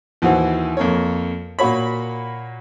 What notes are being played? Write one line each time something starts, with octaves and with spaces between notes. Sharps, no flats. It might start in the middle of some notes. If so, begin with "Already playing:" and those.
D#2 E3 F#4 C5 F#5
F2 A#3 C#5
A#2 A#3 F#4 C#5 B5